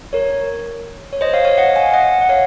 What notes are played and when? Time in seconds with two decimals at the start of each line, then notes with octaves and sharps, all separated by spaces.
0.13 A#4 C#5
1.13 C#5
1.21 C5 D#5
1.33 C#5 F5
1.45 C#5 F5
1.58 D#5 F#5
1.76 F5 G#5
1.93 D#5 F#5
2.21 F#5
2.29 C#5 F5